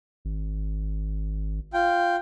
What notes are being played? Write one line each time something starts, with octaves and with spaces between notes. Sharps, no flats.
G#1
F4 G5